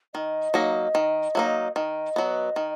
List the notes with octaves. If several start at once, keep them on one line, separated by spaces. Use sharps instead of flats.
D#3 D#5
F#3 A#3 D#4
D#3
F#3 A#3 D#4
D#3 D#5
F#3 B3
D#3